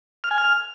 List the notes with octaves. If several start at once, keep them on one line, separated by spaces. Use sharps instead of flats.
F6
G#5
F6